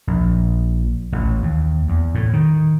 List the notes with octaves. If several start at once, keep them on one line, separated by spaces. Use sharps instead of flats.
A#1
A1
D#2
E2
A2
D#3